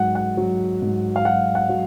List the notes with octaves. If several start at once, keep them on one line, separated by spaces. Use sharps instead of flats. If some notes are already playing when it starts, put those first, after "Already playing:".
Already playing: G#2 F#3 F#5
F#5
F#3
G#2
F5
F#3 F#5
F#5
F#3